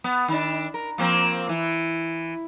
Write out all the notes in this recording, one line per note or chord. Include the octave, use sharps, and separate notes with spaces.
B3
D#3 D4
A#4
F3 A#3 C4
E3